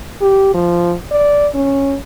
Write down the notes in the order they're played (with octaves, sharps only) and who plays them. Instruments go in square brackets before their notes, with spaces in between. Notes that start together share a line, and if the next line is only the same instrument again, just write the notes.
[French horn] G4
F3
D5
C#4